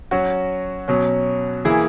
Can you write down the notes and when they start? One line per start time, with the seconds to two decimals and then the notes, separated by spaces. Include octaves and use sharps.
0.11 F#3 C#4 F#4
0.88 B2 F#3 C#4
1.65 E3 A#3 E4 G#4